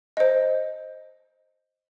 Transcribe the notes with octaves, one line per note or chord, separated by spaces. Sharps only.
C5 D#5